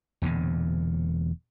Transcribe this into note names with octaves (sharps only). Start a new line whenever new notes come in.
E1 E2 A#2 D3